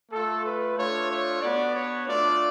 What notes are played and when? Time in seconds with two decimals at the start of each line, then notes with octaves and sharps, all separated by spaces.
0.11 A3 F4 A4
0.44 B4
0.76 A3 D4 F4 C#5
1.09 C#5
1.41 B3 D4 F#4 D5
1.74 C#5
2.07 A3 D4 F4 D5